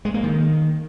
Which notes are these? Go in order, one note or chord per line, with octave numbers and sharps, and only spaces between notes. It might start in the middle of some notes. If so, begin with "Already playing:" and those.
G#3
A#3
D#3